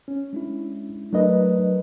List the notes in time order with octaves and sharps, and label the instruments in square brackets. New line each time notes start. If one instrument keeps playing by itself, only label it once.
[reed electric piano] C#4
[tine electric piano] G#3 D4 E4
[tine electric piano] F#3 A#4 B4 [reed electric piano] A3 D4 D#5